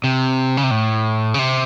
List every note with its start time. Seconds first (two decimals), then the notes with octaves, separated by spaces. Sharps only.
0.04 C3
0.57 C#3
0.63 C3
0.71 A2
1.34 C#3
1.39 C3